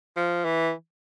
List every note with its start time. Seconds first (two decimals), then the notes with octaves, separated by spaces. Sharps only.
0.17 F3
0.45 E3